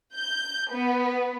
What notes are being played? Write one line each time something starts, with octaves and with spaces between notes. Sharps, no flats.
G6
B3